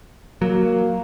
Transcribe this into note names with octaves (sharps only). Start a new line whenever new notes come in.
F#3 A#3